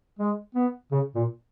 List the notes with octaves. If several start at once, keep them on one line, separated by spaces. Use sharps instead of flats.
G#3
B3
C#3
A#2